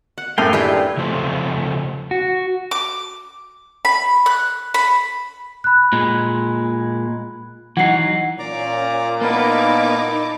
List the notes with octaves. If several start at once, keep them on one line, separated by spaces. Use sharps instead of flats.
F#5
F#2 A2 A#3 A4 F5 G5 G#5
D4 E4 F4 G4 G#4 B4
C#3 F3 A3 C4 C5
F#4
D6
B5
F#6
B5
B5 F#6
A#2 G#3
E3 F#3 D#4 F#5 C7
A#2 C#4 D5 A#5 D6
A#3 B3 D#4 E4 B4 D#5 A5 D6